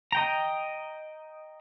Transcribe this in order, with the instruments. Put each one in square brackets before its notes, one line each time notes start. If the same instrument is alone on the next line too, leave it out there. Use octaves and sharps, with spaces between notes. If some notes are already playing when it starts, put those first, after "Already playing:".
[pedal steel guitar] D#5 G5 A#5